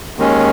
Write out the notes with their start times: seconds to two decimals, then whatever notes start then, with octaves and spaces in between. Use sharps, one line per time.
0.17 D#2 D#3 G#3 C#4